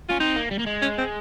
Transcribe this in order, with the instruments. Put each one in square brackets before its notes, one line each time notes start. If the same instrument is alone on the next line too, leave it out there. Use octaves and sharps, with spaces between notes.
[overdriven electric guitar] C#4 [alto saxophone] F4
[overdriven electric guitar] C4 [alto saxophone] D#4
[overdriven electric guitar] A#3
G3
A#3
G#3
[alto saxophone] C#4
C4